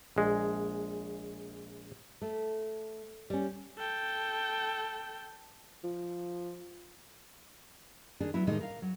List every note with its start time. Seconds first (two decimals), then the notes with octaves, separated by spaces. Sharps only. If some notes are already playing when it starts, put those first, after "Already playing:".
0.16 A#1 G#3
2.21 A3
3.30 G3 C#4
3.78 A4 G5
5.84 F3
8.20 D#3 D4 G#4
8.34 F#3 B3 E4
8.47 A2 C3 D#3 G#3 D#4
8.60 A#4 F5
8.82 F#3